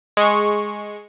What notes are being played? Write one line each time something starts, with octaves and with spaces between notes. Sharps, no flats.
G#3 C#6